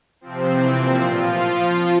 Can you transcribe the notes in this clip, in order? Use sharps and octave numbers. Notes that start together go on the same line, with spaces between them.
C3 F3 C4
C3 E3
A#2 F3 C4
A2 F3 F4